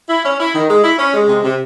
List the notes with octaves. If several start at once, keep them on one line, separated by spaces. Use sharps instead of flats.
E4
C#4
E4
D#3
G#3
E4
C#4
G#3
C3
C3